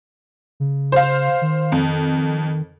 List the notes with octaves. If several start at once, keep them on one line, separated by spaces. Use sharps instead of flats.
C#3
C5 F5
D#3
F2